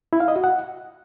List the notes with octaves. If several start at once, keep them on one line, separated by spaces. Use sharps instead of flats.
E4
F5
D#5
F#4
F#5